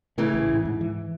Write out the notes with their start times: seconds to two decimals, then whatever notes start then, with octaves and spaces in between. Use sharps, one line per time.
0.18 C#3 E3 A3
0.34 A1
0.49 G#2
0.65 G#2
0.81 E3